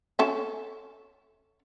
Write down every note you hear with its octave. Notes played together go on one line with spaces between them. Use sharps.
C#4 A4 E5